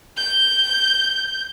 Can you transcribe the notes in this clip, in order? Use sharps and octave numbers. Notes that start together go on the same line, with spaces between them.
G6